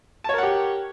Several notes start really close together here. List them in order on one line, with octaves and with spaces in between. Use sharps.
A5 C#5 A#4 F#5 G4